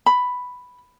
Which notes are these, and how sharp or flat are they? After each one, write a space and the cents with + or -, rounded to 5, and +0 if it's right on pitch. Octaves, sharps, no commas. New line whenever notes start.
B5 +5